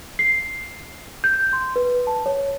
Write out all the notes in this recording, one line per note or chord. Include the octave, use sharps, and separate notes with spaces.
C7
G6
C6
B4
A5
C#5